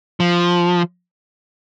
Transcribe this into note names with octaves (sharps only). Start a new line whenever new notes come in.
F3